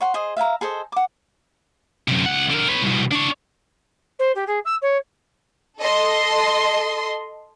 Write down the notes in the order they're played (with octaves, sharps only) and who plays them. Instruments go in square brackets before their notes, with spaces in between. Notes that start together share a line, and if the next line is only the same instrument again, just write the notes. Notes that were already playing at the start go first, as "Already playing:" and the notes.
[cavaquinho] C#5 F#5 C6
G#4 C5 D#5
E5 F5 G5 A#5
G#4 A4 C5 D#5
F#5 D6
[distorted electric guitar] F#2 C3
C#2 F#5
D3 A#4
B4 C#5
C2 B2
D4 C#5
[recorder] C5
G4
G#4
E6
C#5
[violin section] A4 D#5 C6